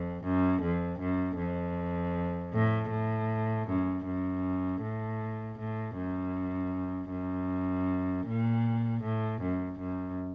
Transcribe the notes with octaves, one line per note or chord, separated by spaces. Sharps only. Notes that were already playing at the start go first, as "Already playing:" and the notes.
Already playing: F2
F#2
F2
F#2
F2
A2
A2
F#2
F#2
A2
A2
F#2
F#2
A#2
A2
F#2
F#2